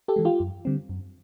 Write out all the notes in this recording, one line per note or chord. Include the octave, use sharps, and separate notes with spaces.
G4 A4
E3 G#3
F4 G4
F#2
D3 G3 C4
F#2